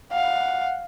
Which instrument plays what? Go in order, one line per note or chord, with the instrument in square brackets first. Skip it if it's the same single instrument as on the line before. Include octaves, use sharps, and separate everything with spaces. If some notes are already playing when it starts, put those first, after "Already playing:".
[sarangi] F5 [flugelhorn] F#5